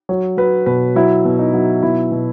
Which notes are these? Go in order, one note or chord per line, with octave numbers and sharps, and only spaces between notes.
F#3 C#5
F#3 B4
B2 B4
F#3 E4
B2
D#4
F#3
B2 E4
B2